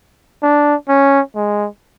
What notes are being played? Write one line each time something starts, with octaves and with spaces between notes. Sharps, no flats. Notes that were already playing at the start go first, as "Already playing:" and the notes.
D4
C#4
G#3